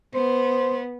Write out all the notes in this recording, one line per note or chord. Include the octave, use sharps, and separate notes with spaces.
B3 C5